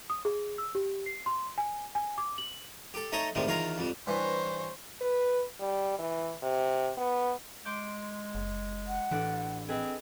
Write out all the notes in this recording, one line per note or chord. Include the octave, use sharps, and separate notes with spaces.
D#6
G#4
E6
G4
C7
C6
G#5
G#5
D6
F#7
G4 A4
A3 D#4 A4 C#5 D#5 A#5
A2 C3 D#3 G3 G#3
E2 D#3 F4 C#5 F5 A#5
F2 G3
G2 E3 C5 C#5
B4
G3
E3
C3
B3
G#3 C6 D6 G6
F#1
F#5
A1 E3 D4 F#6
C4 G#4 B4 D#5